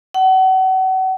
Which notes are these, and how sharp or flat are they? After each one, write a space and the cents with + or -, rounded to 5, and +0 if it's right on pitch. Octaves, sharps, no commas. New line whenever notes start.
F#5 +35